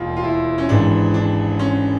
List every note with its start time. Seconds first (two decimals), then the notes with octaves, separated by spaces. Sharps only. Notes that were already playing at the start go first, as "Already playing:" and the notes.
Already playing: E1 D#2 D#3 F4
0.17 F4
0.24 E4
0.58 C#4
0.69 G#1 G#2 E3 D4
1.14 D4
1.59 C#4